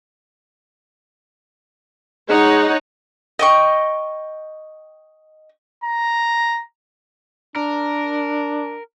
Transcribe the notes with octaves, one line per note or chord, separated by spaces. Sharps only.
G#3 D#4 C#5 F#5
D#5 G5 C#6
A#5
D4 A#4